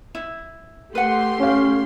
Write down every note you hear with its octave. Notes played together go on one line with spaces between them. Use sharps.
E4
A3 G4 B4 F#5 C6
C#4 C#5 F5